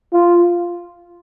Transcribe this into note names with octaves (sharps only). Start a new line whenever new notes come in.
F4